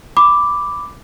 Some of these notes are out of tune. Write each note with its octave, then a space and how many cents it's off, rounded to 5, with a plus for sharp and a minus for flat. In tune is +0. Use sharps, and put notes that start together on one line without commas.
B5 +10 D6 +0